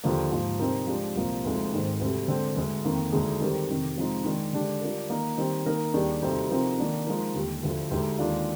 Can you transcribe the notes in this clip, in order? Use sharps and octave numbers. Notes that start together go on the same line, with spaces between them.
D#2 D3 F3 A#3
G#2 F3 A#3
C3 G3 C4 D#4 A#4
F3 G#3 D4 G4
C2 A#2 F3 A#3
D2 C3 F3 G#3 D#4
G#2 D#3 G#3 C4
D2 C3 G3
D3 G#3 C4
D2 D3 G#3
F2 D#3 A#3
D2 D3 G#3 D#4 G#4
D#3 G3 C4 G4 A#4
F2 C3 D#3
C3 F3 G#3 D#4
D#3 G#3 D4
D3 G#3 D4 G4
G3 D4 F4 A#4
D#3 A#3 D#4
D#3 G3 C4 D#4
D#3 A#3 D#4 A#4
D#2 D#3 G3 D4 G#4
D2 C3 G3 C4 D#4
C3 F3 C4 D#4 A#4
D#3 A#3 D4
F3 G#3 D#4 A#4
D#2 D3 G3
D2 D3 F3
D2 D3 G#3 D#4 G4
D#2 D#3 G#3 D4 F4